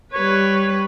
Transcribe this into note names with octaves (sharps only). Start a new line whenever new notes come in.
G3 B4 C#5